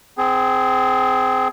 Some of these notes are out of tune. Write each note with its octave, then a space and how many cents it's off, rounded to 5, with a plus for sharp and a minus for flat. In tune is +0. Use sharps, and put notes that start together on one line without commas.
C4 -20 G#4 +5